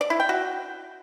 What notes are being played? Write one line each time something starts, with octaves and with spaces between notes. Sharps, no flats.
D5
E4
G5
F#4